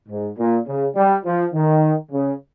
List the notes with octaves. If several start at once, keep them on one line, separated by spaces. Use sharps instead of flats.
G#2
A#2
C#3
G3
F3
D#3
C#3